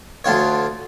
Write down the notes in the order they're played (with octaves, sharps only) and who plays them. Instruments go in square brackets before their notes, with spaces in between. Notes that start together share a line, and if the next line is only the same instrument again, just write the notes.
[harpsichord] D2 D3 F4 C#5